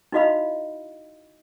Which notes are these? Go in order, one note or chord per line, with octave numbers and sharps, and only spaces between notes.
D#4 E4 F#4 D#5 F5 B5